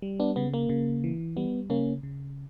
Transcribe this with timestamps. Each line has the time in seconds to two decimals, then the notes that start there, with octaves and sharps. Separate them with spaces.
0.02 G3
0.20 B3 D4
0.36 C#3 B3
0.54 A#3
0.69 C#3
1.04 E3
1.37 G3 B3
1.70 C#3 A#3 C#4
2.03 C#3